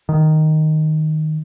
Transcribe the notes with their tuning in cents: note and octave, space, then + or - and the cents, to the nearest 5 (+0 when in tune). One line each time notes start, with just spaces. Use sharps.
D#3 +0